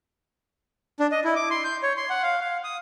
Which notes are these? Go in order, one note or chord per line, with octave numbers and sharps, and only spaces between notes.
D4
D#5
E4
D6
C6
G6
C#5
C6
F#5
F5
F5
D#6